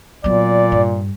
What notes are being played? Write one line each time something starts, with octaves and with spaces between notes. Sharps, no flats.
A#2 F#3 B3 D5
G2